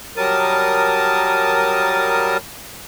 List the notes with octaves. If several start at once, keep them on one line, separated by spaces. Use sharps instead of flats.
F#3 G3 A#4 A5 D#6